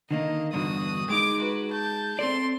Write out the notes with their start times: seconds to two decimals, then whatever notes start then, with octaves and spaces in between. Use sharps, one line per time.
0.11 D3 D#3 A#3 D#5
0.53 E2 G2 D3 F#4 D#6
1.10 G#3 D#4 D6 D7
1.41 F#4 B4
1.71 A5 G6
2.19 C4 A4 D5 C6